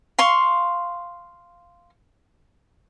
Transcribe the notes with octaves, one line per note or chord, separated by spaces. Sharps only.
F5 C6 C#6